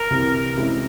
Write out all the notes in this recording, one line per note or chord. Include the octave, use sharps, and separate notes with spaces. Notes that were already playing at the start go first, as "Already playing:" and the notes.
Already playing: A#4
C2 C3 E3 G3
C3 E3 G#3 C#4 E4